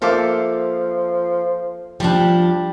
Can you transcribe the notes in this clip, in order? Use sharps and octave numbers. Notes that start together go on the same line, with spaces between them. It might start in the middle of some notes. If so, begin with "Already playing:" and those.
F3 A#3 A4 C5 E5 F5 D6
F3 G3 D4 G4